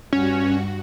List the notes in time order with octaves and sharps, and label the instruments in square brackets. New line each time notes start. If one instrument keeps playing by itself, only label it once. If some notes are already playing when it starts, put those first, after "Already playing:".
[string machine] G2 F#4 [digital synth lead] C#4